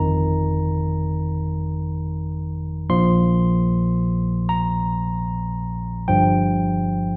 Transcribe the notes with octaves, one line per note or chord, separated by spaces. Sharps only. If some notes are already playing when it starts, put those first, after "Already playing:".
Already playing: G1 F2 D#3 A#5
A#1 A#2 F3 C6
A#5
G1 G2 F3 G5